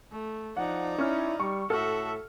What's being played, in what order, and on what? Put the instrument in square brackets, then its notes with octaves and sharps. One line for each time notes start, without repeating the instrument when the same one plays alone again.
[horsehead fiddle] A3
[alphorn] F3 [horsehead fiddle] D#4 D5 [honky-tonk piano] F#5
[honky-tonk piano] C#4 F6 [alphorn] E4
[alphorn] G3 [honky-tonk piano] C#6
[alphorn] A2 [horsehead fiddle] F#4 E5 [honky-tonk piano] A4 F6